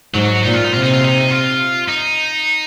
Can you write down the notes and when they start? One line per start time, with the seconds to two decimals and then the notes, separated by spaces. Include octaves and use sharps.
0.14 G#2 F#3
0.43 A#2 D#4
0.54 F4
0.64 D#4
0.73 C3 F4
0.83 D#4
0.93 F4
1.04 D#4
1.30 F4
1.89 D#4